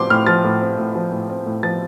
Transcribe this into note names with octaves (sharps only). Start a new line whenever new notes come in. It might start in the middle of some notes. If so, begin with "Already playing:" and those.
Already playing: A2 F3 C4 C6 D6
A2 F6
F3 A6
A2
C4
A2
F3
A2
C4
A2
F3 A6